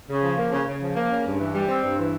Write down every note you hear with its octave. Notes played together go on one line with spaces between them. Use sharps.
C#3
F3
A#3
C#3
C#3
F3
A#3
C#3
G2
E3
G3
C4
G2
E3